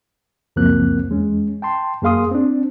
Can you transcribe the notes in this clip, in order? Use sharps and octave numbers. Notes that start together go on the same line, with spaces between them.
C#2 F#2 F3 A#3 C4 F#6
E2 G#3 C#4
G5 A5 C6
F#2 A#3 G#4 F5 C6 D#6
C4 D4